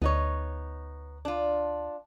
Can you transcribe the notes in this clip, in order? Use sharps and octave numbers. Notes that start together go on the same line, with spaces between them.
D2 B3 D#4 C#5
D4 F4